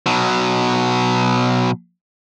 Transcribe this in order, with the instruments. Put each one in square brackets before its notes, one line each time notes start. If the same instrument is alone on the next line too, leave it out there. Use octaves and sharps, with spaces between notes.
[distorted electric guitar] B2 F#3